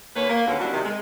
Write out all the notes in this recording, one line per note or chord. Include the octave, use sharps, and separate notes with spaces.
D#2 A#3 B4 C#5
A#3
D#2 D3 F#3 B3 C#4 A#4
G3 C#4 D4 E4 F#4
C3 D#3
G#3